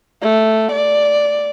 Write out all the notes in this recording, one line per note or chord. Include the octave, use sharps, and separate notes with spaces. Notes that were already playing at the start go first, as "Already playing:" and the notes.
A3
D5